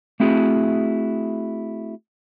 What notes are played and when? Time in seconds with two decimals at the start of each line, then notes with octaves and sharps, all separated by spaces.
0.20 A3 C4 E4 F#4 G#4